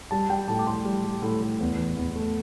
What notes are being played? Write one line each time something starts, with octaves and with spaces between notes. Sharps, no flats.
G3 A5
G3 G5
A2 A5
D6
A2 C6
G3
G3
A2
A2
E2
E3
E2
A3